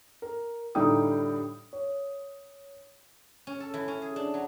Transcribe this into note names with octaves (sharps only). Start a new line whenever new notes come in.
A#4
A2 D3 G3 D#4 G5 D#6
C#5
C#4
A4
E3
C#4
G#4
D4
F#3